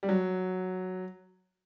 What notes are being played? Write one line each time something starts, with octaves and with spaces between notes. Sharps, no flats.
G3
F#3